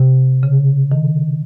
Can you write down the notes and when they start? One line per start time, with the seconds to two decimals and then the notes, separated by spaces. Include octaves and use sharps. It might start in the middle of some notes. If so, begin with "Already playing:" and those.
Already playing: C3
0.43 C#3
0.92 D#3